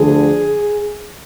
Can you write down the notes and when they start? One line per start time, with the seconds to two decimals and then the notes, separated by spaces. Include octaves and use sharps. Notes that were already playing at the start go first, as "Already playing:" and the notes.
Already playing: D2 D3 F3 G#4